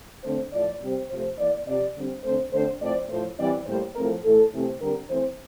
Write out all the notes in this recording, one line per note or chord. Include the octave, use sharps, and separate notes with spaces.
D3 A3 C4 C5
A2 F3 A3 D5
C3 G3 C4
C3 F3 A3 C5
E3 A#3 D5
C3 F3 C4 D5
D3 G3 C4
D3 A3 C4 C5
D3 A3 C4 C5
A2 F3 A3 C4 D5
A2 F3 A3 C5
E3 G3 C4 D5
A2 G3 A#3 C5
A2 F3 A3 C4 A#4
A2 E3 A3 A4
C3 E3 A3 C4
D3 G3 C4 A#4
E3 A3 C4 C5